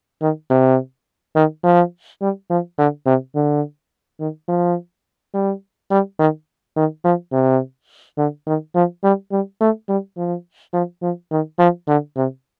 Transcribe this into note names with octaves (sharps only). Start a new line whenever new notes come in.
D#3
C3
D#3
F3
G3
F3
D3
C3
D3
D#3
F3
G3
G3
D#3
D#3
F3
C3
D3
D#3
F3
G3
G3
A3
G3
F3
F3
F3
D#3
F3
D3
C3